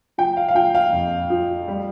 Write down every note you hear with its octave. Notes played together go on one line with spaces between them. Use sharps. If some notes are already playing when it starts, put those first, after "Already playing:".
F3 G5
F5
F5
F3 G5
F5
F2
F3
G3